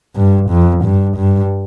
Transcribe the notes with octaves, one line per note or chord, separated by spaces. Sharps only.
G2
F2
G2
G2